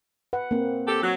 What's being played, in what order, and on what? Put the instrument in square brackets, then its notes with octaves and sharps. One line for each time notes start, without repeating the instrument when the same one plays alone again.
[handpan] B4 F#5
A#3 C4
[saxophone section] G4 A4
F#3